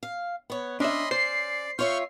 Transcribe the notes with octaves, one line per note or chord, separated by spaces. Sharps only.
F5
B3 C#5
C#4 D4 D#5 E5 B5 C6
C5 D5 C7
F4 C#5 E5 C#6 F6 G6